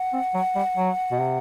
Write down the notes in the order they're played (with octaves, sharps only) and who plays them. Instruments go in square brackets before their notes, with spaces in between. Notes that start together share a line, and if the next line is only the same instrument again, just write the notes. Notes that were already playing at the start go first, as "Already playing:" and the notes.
Already playing: [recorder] F#5
[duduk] C4
F#3
G3
F#3
B2
C3